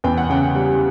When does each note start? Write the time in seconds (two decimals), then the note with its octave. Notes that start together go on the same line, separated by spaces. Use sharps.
0.04 E2 G5
0.18 F#5
0.30 C#3 G5
0.55 G3